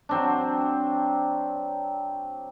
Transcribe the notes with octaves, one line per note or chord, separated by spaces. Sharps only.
F#3 C4 D4